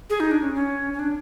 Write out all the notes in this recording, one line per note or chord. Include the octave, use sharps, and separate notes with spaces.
G#4
D#4
D4
C#4
C#4
C#4
D4